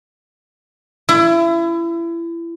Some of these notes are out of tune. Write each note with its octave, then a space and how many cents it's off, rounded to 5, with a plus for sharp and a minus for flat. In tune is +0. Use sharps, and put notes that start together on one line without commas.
E4 +30